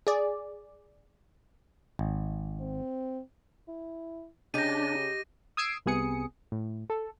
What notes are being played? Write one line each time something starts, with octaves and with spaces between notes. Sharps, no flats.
G#4 D5
G#1
C4
E4
C#3 D4 D#4 G4 A#6 D#7
D#6 E6 G#6 C7 D7 E7
C2 C3 B3 G#4 D#6 C#7
A2
A4